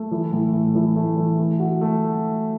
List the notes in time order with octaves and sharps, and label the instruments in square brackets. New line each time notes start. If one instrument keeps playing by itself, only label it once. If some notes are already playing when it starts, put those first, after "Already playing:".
Already playing: [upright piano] A3
E3
A2
A3
E3
A3
E3
A3
F#4
A3